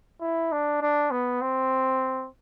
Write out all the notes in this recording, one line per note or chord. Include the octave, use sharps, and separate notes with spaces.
E4
D4
D4
B3
C4